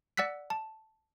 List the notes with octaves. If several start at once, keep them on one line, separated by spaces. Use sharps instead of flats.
D5 F#5 E6 F#6 B6
A5